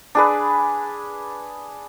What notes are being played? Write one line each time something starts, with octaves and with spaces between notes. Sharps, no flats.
D4 G#4 B4